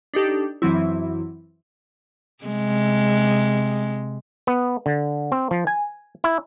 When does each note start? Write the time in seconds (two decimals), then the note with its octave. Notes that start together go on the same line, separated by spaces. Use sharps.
0.14 D4 D#4 G4 A4
0.62 F#2 E3 F#3 C4 E4
2.45 C3 G#3
4.47 B3
4.86 D3
5.32 C4
5.51 F3
5.67 G#5
6.24 E4